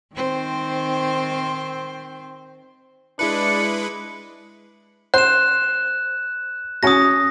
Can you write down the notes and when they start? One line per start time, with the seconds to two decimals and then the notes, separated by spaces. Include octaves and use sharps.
0.14 D#3 C4 C5
3.19 G#3 D4 E4 B4 C#7
5.14 C5 F#6 E7
6.83 C#4 F#4 D#6 A#6